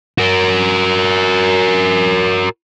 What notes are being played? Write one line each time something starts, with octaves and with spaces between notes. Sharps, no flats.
F#4 A#4